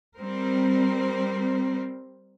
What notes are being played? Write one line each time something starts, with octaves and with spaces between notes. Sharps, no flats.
G3 C4 A#4